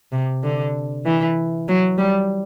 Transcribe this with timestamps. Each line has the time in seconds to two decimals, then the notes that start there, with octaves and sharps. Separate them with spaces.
0.12 C3
0.43 D3
1.05 E3
1.68 F#3
1.98 G3